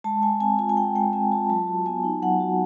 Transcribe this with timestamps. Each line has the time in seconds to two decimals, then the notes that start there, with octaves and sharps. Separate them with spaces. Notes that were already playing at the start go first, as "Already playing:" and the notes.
0.04 G#3 A5
0.23 G#3 G#5
0.40 C4 G#5
0.59 F4 G#5
0.69 G#5
0.77 G#3 G5
0.95 G#3 G5
1.13 C4 G#5
1.32 F4 A5
1.49 F#3 A5
1.67 F#4
1.86 B3 G#5
2.04 D#4
2.22 F#3 F#5
2.40 F#4